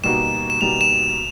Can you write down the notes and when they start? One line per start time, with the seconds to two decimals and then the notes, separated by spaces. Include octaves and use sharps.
0.03 B2 G3 A#3 D#4 F#4 E7
0.50 E7
0.61 B2 G3 A#3 D#4 F#4 F7
0.81 E7